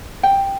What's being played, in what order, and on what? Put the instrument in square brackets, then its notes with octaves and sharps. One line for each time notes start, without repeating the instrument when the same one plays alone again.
[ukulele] G5